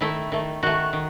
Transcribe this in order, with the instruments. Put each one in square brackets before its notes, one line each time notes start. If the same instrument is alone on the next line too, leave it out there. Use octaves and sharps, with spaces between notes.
[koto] D#3 A3 E4
D#3 A3
D#3 A3 F#4
D#3